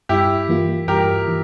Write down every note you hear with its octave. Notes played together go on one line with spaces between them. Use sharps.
G2 E4 G4
E3 A#3 F4
G2 G4 A#4
E3